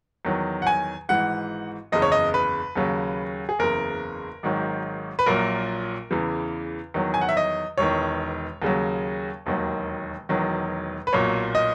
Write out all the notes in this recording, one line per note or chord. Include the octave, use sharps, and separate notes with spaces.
E2 D#3 F#3
F#5
G#5
G#1 G#2 E3 F#5
F#1 E2 C#3 D#5
C#5
D#5
B4
D#2 C#3 F#3
G#4
F#1 E2 C#3 A#4
G#1 G#2 D#3 F#3
B4
A#1 A#2 F#3 A#4
E2 C#3 E3
E2 D#3 F#3
G#5
F#5
E5
D#5
E1 E2 D#3 C#5
D#2 C#3 F#3
E1 D#2 D#3 F#3
E1 E2 D#3 F#3
B4
B1 A#2 F#3 C#5
D#5